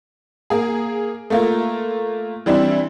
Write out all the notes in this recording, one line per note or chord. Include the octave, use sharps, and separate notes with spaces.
A#3 G#4
A3 A#3 F4
E3 G3 C4 D4 E4